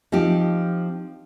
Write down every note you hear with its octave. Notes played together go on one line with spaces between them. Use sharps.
F3 C4 D#4 G4